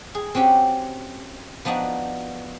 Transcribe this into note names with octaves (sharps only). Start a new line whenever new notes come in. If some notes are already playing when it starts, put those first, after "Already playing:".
G#4
C4 C#4 F#4 G4
F3 B3 D4 D#4 F#4